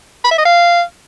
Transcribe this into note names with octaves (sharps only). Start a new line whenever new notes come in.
B5
E5
D#5
F5